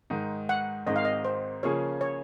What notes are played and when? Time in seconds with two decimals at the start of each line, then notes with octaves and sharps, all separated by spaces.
0.10 G#2 D#3 G#3 D#4
0.49 F#5
0.87 G#1 G#2 D#3 G#3 C4 D#5
0.96 F5
1.05 D#5
1.25 C5
1.63 C#3 F3 A#3 C#4 G#4 C#5
2.01 C#5